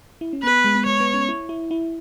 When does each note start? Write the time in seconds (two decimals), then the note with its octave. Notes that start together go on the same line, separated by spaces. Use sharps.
0.21 E4
0.33 C#4
0.43 B3 B4
0.64 G#3
0.75 B3
0.86 G#3 C#5
1.00 B3
1.14 C#4
1.28 E4
1.49 E4
1.71 E4